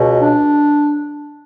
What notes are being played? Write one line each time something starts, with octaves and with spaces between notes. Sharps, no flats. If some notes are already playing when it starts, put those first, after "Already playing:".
Already playing: C#2 B2
D4